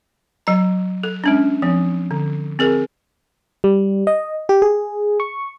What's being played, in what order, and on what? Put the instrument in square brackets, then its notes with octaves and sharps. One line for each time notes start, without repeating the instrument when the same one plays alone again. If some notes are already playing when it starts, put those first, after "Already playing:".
[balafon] F#3 A#5
A4
G#3 C#4 D4
F3 C4
D3
C4 G#4 A#4
[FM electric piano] G3
D#5
G4
G#4
C#6